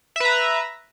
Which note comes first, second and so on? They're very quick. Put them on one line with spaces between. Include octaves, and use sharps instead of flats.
E5 B4 A#5